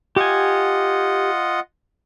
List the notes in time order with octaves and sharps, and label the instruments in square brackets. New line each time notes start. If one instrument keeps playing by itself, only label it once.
[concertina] F4 D#5 F#5 [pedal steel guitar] G4 G#5